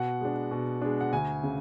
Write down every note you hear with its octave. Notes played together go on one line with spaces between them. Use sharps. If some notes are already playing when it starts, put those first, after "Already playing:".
Already playing: B2 F#5
G#3 D4
B2
G#3 D4
F#5
D2 G#5
C#3